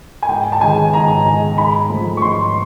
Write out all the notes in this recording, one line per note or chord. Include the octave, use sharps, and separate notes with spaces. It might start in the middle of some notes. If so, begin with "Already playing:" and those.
G#5
G#2 G5
A5
D#3 G#3 G#5
G#2 A#5
D#3 G#3
G#2 B5
F3 A3
C#6
G#2 C6